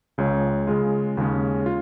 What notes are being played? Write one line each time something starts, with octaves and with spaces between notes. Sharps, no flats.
C#2 C#3 G#3 F4 C#5
C#3 G#3 F4
D#2 C#3 G#3 C#4
F4